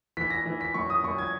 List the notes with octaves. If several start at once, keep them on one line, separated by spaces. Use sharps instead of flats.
E3 B6
A#6
E3
B6
F#2 C#6
D#6
F#2 C#6
G#6